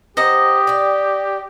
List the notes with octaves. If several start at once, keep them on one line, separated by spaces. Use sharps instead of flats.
G4 C5 D#5 F#5 A#5
D5 G5